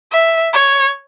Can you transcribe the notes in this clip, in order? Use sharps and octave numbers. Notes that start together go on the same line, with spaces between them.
E5
C#5